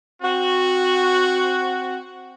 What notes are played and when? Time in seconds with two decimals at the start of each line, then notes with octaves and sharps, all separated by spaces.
0.22 C4 F#4